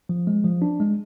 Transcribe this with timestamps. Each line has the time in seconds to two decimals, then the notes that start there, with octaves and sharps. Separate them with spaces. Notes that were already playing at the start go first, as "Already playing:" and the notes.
0.09 F3
0.27 G#3
0.44 F3
0.62 D4
0.80 G#3